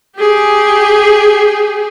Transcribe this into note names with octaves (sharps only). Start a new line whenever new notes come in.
G4 G#4